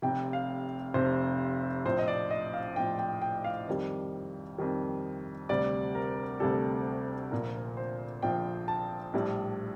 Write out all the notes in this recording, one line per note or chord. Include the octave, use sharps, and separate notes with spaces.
F1 F2 C3 G5
F5
F1 F2 C3 C5
A#1 A2 F3 C5
D#5
D5
D#5
F5
A#1 A2 F3 G5
G5
G5
F5
F2 D#3 G3
F2 D#3 G3
D2 C3 G3 D5
A#4
D2 C3 G3 A4
A#1 A#2 F3 A#4
C5
A#1 A#2 F3 G5
A5
A#1 A2 G3